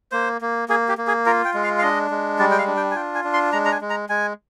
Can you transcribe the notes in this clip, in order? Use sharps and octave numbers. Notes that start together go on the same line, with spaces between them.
A#3 C5
A#3
A#3 G#4
G4
A#3
G#4
F4 A#4
G5
G#3
F5
F5
D4 D#5
G#3
G3 D5
G5
F5
D4
G5
G#5
F4 G5
G#5
D4
C6
G#3 A#5
A#5
G#5
G#3
A#5
G#3 G#5